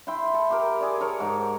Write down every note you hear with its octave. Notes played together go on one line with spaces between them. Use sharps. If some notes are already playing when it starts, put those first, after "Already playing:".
E4 G5 C6
A4
G4 A#4
G#4 D5
A4 A#4 C#5
G#2 A#4